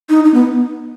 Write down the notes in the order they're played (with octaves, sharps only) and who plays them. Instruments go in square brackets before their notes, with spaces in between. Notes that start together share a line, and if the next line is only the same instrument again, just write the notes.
[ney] D#4
D#4
B3